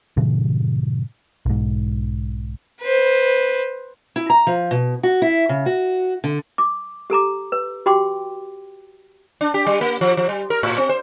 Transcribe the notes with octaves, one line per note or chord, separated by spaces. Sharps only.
G2 A#2 C#3 E3
B1 G#2
B4 C5
E4
A#5
F3
B2
F#4
E4
C#3
F#4
D3
D6
G4 A4 A#5 D6
B4
F#4 G4 G5 C6 D6
D4
G4
G3
A#3
F3
F3
G3
A#4
A2
C4
C5